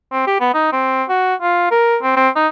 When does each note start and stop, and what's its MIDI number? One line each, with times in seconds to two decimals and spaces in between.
0.12 0.26 60
0.27 0.39 67
0.40 0.49 59
0.54 0.70 63
0.73 1.03 60
1.09 1.35 66
1.41 1.69 65
1.71 1.97 70
2.03 2.15 60
2.17 2.29 60
2.36 2.48 63